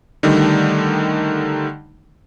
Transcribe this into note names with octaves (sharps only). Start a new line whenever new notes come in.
D3 D#3 G3 A3 D#4